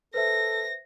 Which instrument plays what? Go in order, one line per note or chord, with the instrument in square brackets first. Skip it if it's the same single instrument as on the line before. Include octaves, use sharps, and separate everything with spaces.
[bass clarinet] A4 [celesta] B4 C5 E5 [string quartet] A#6